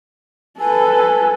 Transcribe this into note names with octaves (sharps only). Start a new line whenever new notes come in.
A4 B4 G#5